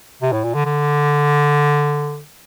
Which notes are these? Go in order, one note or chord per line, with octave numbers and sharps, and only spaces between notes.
C3
A2
A#2
D3
D3